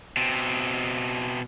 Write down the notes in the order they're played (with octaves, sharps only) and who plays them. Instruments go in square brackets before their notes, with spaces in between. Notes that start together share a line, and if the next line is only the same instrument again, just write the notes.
[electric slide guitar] B2 C4